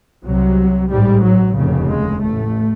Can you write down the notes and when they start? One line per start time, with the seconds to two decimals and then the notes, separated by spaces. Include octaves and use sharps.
0.24 C2 C3 F#3
0.90 A1 G#2 G3
1.23 F#3
1.55 F1 D#2 C#3
1.88 G#3
2.20 A1 A2 A3